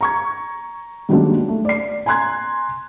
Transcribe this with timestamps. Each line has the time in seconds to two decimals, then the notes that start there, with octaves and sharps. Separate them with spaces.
0.01 A#5 C#6 G#6
1.09 G2 D#3 F#3 G#3 A#3 D4
1.48 A3
1.65 D5 C7
2.06 G#5 A#5 C6 F#6 G#6